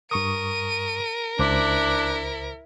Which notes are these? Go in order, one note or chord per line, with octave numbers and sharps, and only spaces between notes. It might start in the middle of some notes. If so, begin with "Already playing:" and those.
G2 A#4 C#6 D#6 D#7
C#2 D4 E4 C5 D6